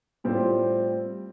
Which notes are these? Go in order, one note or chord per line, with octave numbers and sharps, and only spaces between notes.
A2 G3 C4 F4